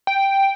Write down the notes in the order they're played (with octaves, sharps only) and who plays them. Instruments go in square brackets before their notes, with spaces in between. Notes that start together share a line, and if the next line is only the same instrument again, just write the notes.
[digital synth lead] G5